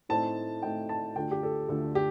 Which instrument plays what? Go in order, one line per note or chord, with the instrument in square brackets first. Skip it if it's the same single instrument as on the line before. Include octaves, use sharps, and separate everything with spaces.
[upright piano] A2 A3 C4 D#4 A5
A2 A3 C4 D#4 G5
A5
D2 D3 A3 D4 F4 G5
G4
A4
D2 D3 A3 D4 F4 A4
G4